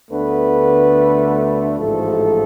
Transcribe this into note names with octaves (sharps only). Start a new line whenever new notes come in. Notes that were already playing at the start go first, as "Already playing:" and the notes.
D2 D3 A3 B3 B4
A1 G#2 F3 A3 A4